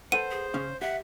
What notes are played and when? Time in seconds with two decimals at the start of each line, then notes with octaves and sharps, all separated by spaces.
0.12 A4 B4 C5 F#5 D#7
0.31 G#4
0.54 C#3 C#4 F5
0.81 G4 E5 F#5